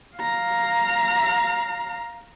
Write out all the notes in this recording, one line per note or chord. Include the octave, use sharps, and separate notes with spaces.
F5 A#5